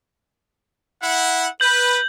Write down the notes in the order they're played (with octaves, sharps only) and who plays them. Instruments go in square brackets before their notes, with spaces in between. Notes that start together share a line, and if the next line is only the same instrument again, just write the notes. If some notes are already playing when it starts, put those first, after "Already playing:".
[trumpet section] E4 F#5
[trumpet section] B4 [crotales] G6 F#7